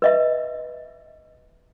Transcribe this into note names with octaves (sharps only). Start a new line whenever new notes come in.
B4 D#5 E5